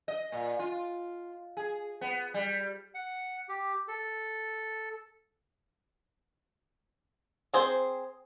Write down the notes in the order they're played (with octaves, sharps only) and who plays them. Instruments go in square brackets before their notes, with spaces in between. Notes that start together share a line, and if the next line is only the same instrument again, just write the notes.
[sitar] D#5
A#2
F4
G#4
B3
G3
[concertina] F#5
G4
A4
[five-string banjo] C4 G#4 C5